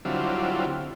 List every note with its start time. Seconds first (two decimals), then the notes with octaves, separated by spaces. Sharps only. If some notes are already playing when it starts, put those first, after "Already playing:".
0.05 D3 F#3 G3 C4 E4 F4